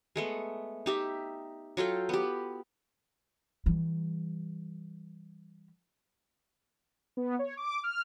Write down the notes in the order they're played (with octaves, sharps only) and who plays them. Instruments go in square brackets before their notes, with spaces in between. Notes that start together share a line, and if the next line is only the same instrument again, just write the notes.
[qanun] G#3 A3 B3
D#4 G4 E5
F#3 F4 A4 G5
B3 G4
[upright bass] E3 G3
[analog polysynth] B3
C#5
D6
F6